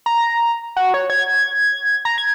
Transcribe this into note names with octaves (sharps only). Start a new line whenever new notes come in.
A#5
F#4
C#5
G#6
A#5
G#6